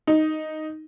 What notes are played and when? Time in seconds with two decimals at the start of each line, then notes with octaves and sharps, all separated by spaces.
0.07 D#4